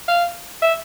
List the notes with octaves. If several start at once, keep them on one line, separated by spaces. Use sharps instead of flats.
F5
E5